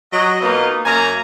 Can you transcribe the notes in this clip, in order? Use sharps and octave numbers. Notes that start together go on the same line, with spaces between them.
F#3 D#5
B2 A#3 B3 D#4 F4 D#5
F#2 A#3 G#5 A#5